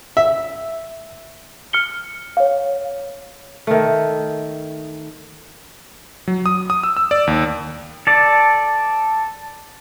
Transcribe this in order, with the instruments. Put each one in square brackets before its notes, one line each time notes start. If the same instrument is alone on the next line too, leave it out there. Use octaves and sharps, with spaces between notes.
[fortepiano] E5
[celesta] F6 C#7 G7
C#5 F5
[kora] D#3 A3
[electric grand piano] F#3
D#6
D#6
E6
E6
D5
D#2
[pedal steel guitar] A4 D5